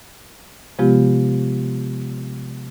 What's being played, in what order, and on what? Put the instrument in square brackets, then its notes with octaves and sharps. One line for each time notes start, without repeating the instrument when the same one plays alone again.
[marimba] C3 F3 G#3 B3 F4 G4